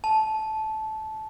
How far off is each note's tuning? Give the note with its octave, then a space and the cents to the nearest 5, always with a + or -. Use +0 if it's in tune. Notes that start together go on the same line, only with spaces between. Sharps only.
A5 -15